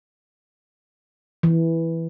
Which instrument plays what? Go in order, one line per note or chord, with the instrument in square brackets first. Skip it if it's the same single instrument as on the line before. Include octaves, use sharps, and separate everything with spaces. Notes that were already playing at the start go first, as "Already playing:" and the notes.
[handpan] E3